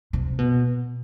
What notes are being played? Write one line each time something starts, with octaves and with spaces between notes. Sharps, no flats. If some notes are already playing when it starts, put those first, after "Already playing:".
C3
B2